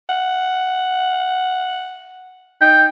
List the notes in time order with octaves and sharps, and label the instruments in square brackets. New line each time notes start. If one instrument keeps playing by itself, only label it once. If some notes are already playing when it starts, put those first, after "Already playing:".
[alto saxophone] F#5
[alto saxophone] D#4 [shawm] G5